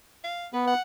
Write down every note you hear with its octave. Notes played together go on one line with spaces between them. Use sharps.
F5
B3 B4
F#5